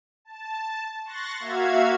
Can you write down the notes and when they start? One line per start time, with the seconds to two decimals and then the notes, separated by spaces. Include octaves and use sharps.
0.25 A5
1.05 C6 C#6 F#6 A6 A#6
1.40 A#3 F#4 E5 F5 G#6